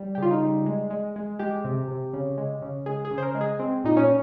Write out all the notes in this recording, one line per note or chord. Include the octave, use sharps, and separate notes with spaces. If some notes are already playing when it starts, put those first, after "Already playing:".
Already playing: G3
G4
C#3 F4
D#4
G3
G#3
G#3
G#3
G#3 G4
C3
C3
C#3
G#3
C#3
G#3 G#4
G#4
C#3
C5
A#4
G#3
G#4
G#3 C4
A#2 D#4
C#4